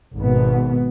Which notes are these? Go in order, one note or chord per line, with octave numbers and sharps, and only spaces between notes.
G#1 B2 B3